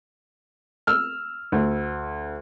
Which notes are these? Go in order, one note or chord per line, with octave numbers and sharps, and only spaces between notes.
E6 F6
D2